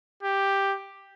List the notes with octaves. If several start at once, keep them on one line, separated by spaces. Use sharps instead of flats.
G4